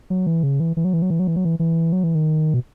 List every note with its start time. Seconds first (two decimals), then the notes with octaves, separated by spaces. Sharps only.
0.10 F#3
0.27 E3
0.43 C#3
0.60 E3
0.77 E3
0.85 F#3
0.93 E3
1.02 F#3
1.10 E3
1.19 F#3
1.27 E3
1.36 F#3
1.45 E3
1.59 E3
1.93 F#3
2.04 E3
2.15 D#3
2.54 B2